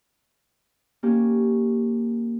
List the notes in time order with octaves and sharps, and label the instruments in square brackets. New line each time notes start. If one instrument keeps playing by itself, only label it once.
[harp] A#3 C#4 G4